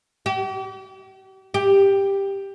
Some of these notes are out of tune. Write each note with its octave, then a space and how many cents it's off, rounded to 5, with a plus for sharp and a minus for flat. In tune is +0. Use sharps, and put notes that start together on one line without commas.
G4 -45
G4 +5